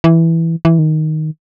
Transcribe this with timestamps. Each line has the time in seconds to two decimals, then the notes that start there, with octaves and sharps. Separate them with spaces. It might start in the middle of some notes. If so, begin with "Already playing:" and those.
0.04 E3
0.65 E3
0.79 D#3